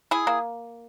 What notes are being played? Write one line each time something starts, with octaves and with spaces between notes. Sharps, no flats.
E4 G#4
A#3